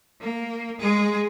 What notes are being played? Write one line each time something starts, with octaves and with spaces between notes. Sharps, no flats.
A#3
G#3 G#4